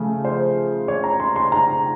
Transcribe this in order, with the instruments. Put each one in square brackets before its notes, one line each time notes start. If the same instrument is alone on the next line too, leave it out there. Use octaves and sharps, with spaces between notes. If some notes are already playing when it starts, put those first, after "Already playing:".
Already playing: [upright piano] C#3 F3 A3
C5
C#5
A#5
C6
C6
A#5